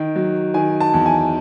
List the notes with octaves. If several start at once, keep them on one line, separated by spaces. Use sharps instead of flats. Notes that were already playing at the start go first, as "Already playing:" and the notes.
Already playing: D#3
F#3
D#3 G#5
A5
E2
G#5